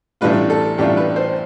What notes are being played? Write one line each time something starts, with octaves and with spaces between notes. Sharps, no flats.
A1 A2 G3 D4 F4 B4
A4
A1 A2 G3 D4 F4 G4
B4
C5